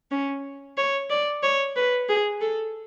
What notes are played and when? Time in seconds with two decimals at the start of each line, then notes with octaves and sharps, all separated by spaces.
0.11 C#4
0.78 C#5
1.10 D5
1.43 C#5
1.76 B4
2.09 G#4
2.41 A4